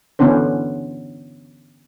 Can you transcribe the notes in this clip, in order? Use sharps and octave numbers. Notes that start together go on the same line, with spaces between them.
D3 E3 B3 C#4 D4 C5